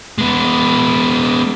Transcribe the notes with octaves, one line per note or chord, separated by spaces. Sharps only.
G#3 B3